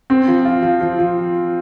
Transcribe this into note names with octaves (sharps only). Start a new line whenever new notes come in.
C4
F3
F4
F3
F3
F3